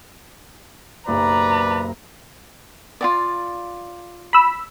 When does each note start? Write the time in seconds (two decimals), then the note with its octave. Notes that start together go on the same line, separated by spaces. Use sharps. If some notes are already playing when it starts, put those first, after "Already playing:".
1.08 F#1 B1 G4 B4 D5 A#5
3.01 F4 F#4 D5
4.33 B5 E6